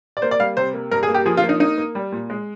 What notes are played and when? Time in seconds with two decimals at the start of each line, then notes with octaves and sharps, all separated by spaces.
0.17 D5
0.22 A#3 C5
0.31 D5
0.39 G3 F5
0.57 C3 C5
0.74 A#3
0.91 G2 A#4
1.03 G#4
1.09 A#3
1.14 G4
1.25 F3 G#4
1.37 F4
1.43 A#3
1.49 D#4
1.60 A#3 D#4
1.78 A#3
1.95 G3
2.12 A#2
2.30 G#3